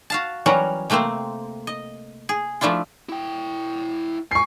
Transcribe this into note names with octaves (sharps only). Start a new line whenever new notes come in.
F#4 F5 A5
E3 F#3 G3 C#4 A#4 F#5
C3 A3 A#3 C4 C5
D#5
G#4
F3 A3 D4 E4 F4
E4 G5
G#5 C#6 C7